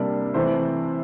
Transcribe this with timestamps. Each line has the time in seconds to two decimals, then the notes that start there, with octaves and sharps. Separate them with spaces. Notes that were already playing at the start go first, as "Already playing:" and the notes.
Already playing: C3 G3 A#3 D4 A4
0.34 C3 E3 A3 C4 C5